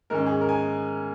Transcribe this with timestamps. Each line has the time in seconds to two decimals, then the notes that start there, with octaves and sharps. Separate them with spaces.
0.10 G#2 D#3 C#4 A#4
0.26 G#4
0.41 A#4
0.49 G#5